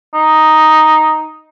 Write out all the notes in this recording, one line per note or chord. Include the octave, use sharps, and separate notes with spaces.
D#4